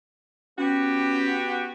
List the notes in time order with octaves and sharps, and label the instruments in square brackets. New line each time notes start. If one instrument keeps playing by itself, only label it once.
[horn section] B3 F#4 G4 [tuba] C#4